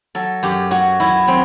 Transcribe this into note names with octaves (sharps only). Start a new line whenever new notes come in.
F#3 A4
F#2 G4
F#3 F#4
F#3 E4
F#3 C4